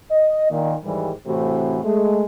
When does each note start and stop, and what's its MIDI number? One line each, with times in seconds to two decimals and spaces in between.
0.11 0.48 75
0.51 0.75 46
0.51 0.75 51
0.85 1.11 44
0.85 1.11 51
0.85 1.11 52
0.85 1.11 55
1.27 1.80 45
1.27 1.80 48
1.27 1.80 52
1.27 1.80 57
1.27 1.80 60
1.27 1.80 66
1.84 2.24 56
1.84 2.24 57